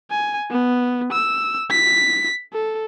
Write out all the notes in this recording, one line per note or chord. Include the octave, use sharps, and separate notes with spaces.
G#5
B3
E6
B6
A4